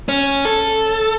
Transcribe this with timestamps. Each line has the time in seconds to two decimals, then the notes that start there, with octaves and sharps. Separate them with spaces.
0.09 C#4
0.45 A4